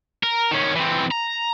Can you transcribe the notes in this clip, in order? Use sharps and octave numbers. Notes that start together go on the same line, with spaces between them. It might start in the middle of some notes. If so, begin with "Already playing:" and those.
A#4
D#3 C#4
E3 C4
A#5